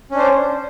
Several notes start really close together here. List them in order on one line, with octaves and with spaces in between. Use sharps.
C#4 D4 C5